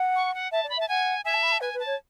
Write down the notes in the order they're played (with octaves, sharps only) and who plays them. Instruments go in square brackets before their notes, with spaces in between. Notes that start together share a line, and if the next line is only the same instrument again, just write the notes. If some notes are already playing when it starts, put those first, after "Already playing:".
Already playing: [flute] F#5
[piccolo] C#6
F#5
[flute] E5 [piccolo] A5
[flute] D5
[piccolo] B5
[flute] E5
[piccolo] A5
[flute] F#5 [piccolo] G#5
[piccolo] E5 [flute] G#5
[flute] A5
B5
A5
[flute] B4 [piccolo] G#5
[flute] B4
[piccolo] A5
[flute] C#5